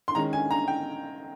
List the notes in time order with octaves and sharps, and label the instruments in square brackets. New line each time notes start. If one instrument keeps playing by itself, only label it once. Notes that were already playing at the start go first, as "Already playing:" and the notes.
[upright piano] C6
D#3 G#3 C#4 A#5
G#5
A#5
G5